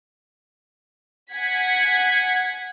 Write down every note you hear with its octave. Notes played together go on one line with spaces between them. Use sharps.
F#5 G#5 G#6 B6